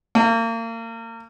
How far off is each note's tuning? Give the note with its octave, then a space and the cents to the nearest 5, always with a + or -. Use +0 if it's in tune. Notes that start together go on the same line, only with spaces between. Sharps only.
A#3 -35